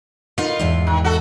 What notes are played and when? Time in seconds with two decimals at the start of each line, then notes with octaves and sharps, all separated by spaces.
0.38 D#4 F4 A#4 B4
0.59 E2 G#2 E5
0.87 D#3
1.04 F#4 A4